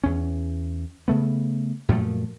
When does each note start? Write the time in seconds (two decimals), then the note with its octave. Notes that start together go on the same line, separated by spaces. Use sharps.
0.04 E2 C#4
1.08 C#3 A3 B3
1.89 F#2 A#2 F3 A3